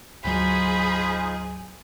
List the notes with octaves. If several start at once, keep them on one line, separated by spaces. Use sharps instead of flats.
D2 G#2 F#3 D#4 F4 G#4 C5 B5